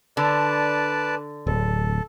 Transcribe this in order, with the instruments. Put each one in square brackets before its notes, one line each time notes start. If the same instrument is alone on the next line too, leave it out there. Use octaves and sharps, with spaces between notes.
[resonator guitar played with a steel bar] D3 [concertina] B4 D5 A5
[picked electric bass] D1 [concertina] A4